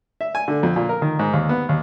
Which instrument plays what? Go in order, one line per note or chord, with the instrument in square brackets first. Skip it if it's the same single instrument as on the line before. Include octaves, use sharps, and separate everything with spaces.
[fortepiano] E5
G#5
D3
F2
A#2
A#4
D#3
G#2
D#2
B3
D#2